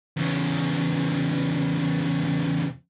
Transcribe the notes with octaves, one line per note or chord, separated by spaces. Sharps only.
E2 C#3